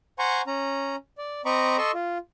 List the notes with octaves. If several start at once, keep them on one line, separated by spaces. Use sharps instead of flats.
C5 F#5 G#5 A#5 C6 C#6
C#4 A#5
D5
C4 D#5 A#5 B5 C#6 D6
A4 D#5 C6 C#6 E6
F4